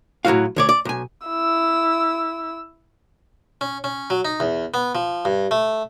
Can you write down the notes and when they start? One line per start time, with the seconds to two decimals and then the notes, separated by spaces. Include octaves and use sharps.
0.25 A2 F#3 E4 F#4 F5
0.56 D2 C#5 D5
0.69 D5
0.85 B1 G#5
1.27 E4 E6
3.61 C#4
3.84 C#4
4.10 F#3
4.25 D#4
4.40 E2
4.74 B3
4.95 F3
5.25 G2
5.51 A3